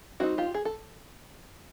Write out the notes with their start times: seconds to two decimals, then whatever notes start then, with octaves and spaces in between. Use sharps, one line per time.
0.20 G3 C4 D#4 E4 F#4
0.38 F4 G4
0.54 G#4
0.65 A4